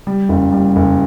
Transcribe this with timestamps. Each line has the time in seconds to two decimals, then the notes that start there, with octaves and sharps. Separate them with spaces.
0.07 G3
0.29 F#1
0.52 G3
0.76 F#1